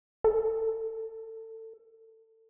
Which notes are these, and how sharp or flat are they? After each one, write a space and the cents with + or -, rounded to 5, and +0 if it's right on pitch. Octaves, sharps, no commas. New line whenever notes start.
A4 +25